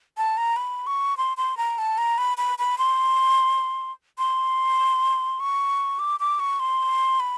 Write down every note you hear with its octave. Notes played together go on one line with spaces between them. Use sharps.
A5
A#5
B5
C#6
C6
C6
A#5
A5
A#5
B5
B5
B5
C6
C6
C#6
D6
D6
C#6
C6
B5